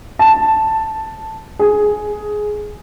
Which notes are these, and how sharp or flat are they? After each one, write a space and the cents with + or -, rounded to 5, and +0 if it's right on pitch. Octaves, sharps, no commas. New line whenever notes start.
A5 +0
G#4 +10